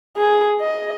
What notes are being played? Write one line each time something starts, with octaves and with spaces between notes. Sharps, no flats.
G#4
D#5